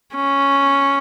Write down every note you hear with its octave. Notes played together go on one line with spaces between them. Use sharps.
C#4